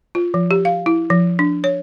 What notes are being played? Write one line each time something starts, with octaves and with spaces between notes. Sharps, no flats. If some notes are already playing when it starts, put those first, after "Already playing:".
F4
F3
G4
F5
E4
F3
D4
C#5